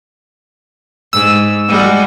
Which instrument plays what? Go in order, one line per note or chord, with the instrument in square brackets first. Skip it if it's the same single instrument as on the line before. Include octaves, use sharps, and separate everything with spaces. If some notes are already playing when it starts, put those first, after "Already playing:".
[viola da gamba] G#2 [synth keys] E6
[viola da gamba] G3 G#3 F#4